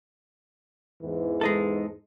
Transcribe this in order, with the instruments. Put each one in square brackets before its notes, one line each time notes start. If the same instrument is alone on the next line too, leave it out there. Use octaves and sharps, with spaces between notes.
[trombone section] E2 G#2 E3
[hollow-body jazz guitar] G#3 D#4 A4